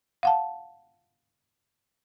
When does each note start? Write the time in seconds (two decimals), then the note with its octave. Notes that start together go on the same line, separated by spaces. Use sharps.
0.23 F5 F#5 A5